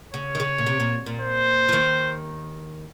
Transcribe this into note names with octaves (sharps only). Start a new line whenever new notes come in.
C#3 C#5
D#3
C#3
A#2
C3
A#2
A#2
C5
F3
D#2 D#3